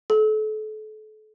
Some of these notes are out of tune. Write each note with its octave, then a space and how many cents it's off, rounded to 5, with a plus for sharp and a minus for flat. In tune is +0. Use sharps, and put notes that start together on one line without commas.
A4 -35